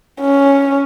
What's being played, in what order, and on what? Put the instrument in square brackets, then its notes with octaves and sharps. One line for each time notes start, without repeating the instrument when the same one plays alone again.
[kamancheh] C#4